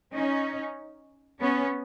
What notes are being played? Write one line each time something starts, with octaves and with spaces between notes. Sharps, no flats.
C#4 D#4
B3 C#4